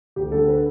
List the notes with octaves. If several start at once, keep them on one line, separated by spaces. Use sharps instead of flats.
D2 G4
D3 A4
B4